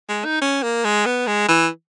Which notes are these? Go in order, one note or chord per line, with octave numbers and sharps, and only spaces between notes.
G#3
D#4
C#4
A#3
G#3
B3
G#3
E3